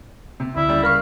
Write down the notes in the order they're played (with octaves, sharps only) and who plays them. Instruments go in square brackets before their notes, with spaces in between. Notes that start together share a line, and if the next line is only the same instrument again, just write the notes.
[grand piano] C3
[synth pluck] D2 D3 [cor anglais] E4
[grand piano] C#3 G3 D5
[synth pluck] A#4 B5 C#6 [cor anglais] F5